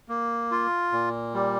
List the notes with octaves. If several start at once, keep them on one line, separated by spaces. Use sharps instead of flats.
A#3
F4
A#2
G3